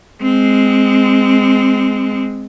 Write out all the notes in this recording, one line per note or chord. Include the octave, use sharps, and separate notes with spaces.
G#3 C4